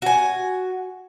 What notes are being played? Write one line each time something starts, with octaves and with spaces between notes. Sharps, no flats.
F#4 G#5